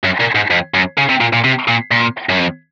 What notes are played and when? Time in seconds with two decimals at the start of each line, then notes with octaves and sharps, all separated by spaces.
0.04 F#2
0.20 A#2
0.35 G#2
0.50 F2
0.74 F#2
0.98 C#3
1.09 C3
1.20 A#2
1.33 A#2
1.44 C3
1.68 A#2
1.91 A#2
2.29 F#2
2.38 F2